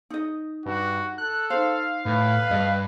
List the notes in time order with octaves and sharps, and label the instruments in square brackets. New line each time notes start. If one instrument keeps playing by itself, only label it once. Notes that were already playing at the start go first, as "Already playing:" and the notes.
[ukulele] D#4 D#5
[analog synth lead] G2 [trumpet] F#4
[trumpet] A4 [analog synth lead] F#6
[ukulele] D#4 C5 [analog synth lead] F5
[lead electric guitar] A2 [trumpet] B4
[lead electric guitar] G2 [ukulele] D#5